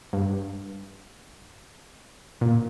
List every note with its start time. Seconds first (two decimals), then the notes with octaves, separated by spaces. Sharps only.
0.13 G2
2.41 A#2